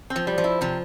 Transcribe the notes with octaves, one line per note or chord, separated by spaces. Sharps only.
C4
F3
G3
F3
E4
C3 F3